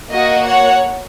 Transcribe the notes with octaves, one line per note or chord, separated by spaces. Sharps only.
A#3 F#4 D#5
C#5 F#5